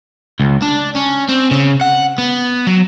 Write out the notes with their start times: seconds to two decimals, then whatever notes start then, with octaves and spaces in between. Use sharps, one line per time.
0.40 C#2
0.62 D4
0.96 C#4
1.29 C4
1.51 C#3
1.81 F#5
2.18 B3
2.67 F#3